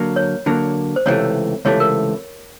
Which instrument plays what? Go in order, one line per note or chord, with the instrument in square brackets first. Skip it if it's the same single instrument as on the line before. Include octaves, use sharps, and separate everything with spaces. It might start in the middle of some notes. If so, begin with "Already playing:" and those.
Already playing: [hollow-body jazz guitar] D3 F#3 A#3
[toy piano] C#5
[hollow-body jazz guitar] D3 F#3 A#3
[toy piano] C5
[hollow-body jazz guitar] C#2 C3 E3 A3 [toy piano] C#5
[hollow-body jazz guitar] C#2 C3 E3 A3 [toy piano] C#5
[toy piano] A#4